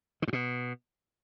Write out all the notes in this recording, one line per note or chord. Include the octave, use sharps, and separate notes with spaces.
D#3
G2
B2